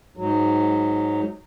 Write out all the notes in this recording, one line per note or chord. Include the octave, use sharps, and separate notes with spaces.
G#2 F#3